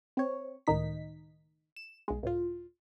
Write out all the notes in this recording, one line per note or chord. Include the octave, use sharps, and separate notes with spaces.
C4 C#5
C#2 A2 D#3 D#4 B6
E7
B1 G#3
C#2 A2 F4